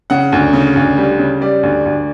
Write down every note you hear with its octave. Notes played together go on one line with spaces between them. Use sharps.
C#3 F#5
D2
C#3
D2
G3
C#3
G3 D5
D2
D2